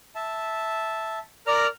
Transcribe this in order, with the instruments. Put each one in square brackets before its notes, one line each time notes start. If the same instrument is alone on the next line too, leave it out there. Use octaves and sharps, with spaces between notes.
[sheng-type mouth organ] E5 A5
[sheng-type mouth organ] A#4 A#5 F6 [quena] D5